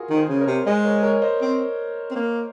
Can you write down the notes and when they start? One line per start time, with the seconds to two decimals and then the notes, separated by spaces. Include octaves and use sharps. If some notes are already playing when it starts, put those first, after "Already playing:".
Already playing: F4 F#4 G#4 A#4
0.10 D#3
0.16 G#4 C5
0.29 C#3
0.41 A#4 C#5
0.47 C3
0.66 G#3 C5 D#5
0.85 A#4 C#5
1.03 A#4 C#5
1.22 C5 D#5
1.41 C4
2.11 C4
2.16 A#3